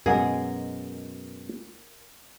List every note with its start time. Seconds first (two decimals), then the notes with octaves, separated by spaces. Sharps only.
0.06 F#2 B2 G#3 G#4 A#4 D#5 F#5 G#5